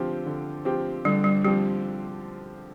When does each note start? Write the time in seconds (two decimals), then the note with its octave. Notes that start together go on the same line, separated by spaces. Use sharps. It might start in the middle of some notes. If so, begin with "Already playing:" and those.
Already playing: D3 F3 C4 G4
0.26 D3
0.65 F3 C4 G4
1.05 D3 G3
1.24 G3
1.44 F3 G3 C4 G4